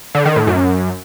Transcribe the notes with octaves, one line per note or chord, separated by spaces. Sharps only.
D3
D#3
A2
F#2